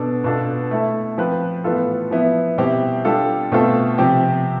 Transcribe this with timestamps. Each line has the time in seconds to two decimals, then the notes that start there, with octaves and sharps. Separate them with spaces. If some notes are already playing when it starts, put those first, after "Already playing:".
Already playing: B2 B3 D4 A4
0.24 B2 B3 D4 F4 A4
0.71 A3 E4 A4
1.18 F3 C4 F4 B4
1.64 A2 E3 B3 F4 A4
2.11 F3 B3 E4
2.58 B2 G3 C4 E4 G4
3.05 G3 D4 F4 A4
3.52 B2 A3 C4 F4 A4
3.98 C3 F3 C4 G4